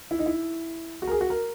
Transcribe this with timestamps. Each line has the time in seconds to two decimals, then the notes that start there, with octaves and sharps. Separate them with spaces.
0.11 E4
0.19 D#4
0.26 E4
1.02 F#4
1.07 A#4
1.11 G#4
1.21 F#4
1.30 A#4